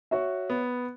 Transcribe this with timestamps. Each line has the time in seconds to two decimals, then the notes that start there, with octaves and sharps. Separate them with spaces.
0.11 F#4 C#5 E5
0.50 B3